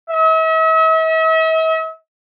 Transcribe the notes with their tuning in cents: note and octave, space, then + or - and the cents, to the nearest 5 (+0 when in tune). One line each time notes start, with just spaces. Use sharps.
E5 -45